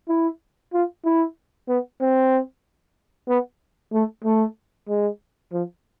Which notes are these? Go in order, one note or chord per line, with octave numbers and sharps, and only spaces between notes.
E4
F4
E4
B3
C4
B3
A3
A3
G#3
F3